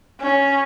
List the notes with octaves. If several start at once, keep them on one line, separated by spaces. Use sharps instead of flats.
C#4